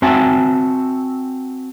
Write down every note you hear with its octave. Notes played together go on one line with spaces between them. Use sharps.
C4 F#4 E5 G#5 A5